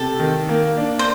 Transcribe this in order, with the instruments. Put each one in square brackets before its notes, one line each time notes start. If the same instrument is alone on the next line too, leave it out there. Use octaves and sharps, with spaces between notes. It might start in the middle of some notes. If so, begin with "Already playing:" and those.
Already playing: [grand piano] C3 [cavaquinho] A4
[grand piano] D#3
A#3
D4
[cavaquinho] C5